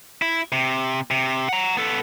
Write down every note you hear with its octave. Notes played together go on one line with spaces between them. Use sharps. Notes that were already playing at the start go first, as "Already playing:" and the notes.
E4
C3
C3
F#5 A#5
B3 A4